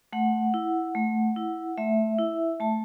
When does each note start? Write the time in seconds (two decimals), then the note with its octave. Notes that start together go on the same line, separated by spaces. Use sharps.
0.13 A3 F#5
0.54 E4
0.95 A3
1.36 E4
1.78 A3 E5
2.19 E4
2.60 A3 A5